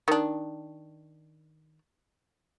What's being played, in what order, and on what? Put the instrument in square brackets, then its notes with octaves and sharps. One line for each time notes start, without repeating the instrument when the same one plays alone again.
[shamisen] D#3 D4